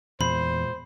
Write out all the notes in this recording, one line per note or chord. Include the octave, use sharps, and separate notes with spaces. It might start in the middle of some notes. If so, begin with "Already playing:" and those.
E2 A#2 G#3 F4 C5 B5